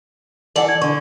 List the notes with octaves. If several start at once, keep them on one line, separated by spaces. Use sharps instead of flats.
E3 A4 D5 F#5 F#7
G#6
D3 C#6